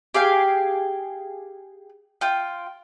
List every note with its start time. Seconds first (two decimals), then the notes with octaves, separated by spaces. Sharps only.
0.14 G4 G#4 F5 G5
2.21 F4 G5